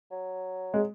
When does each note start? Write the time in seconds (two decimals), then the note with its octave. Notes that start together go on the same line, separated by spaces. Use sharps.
0.11 F#3
0.74 G#3